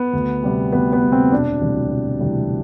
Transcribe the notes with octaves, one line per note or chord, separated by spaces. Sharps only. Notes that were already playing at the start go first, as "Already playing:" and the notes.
Already playing: B3
D2
C3 G3
D2 B3
B3
C3 G3
C4
E1 D4
D2 C3 E3 G3
E1
D2 C3 E3 G3